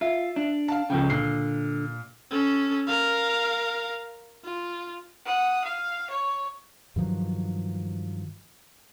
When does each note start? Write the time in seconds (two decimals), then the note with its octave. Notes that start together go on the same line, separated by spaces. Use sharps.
0.01 F4 E5
0.36 D4
0.68 F5 A5
0.90 C#2 C#3 F3 A4 G5
1.10 A#2 D3 C7
2.31 C#4 A4
2.87 A#4 F5
4.45 F4
5.25 F#5 D#6
5.64 F5
6.10 C#5
6.96 G2 D#3 F3 F#3